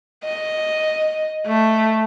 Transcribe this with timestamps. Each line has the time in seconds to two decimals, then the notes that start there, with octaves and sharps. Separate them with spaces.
0.24 D#5
1.47 A3